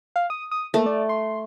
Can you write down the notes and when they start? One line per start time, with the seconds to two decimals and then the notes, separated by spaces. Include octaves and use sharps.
0.16 F5
0.30 D#6
0.51 D#6
0.74 A3 A#3
0.86 D5
1.09 C6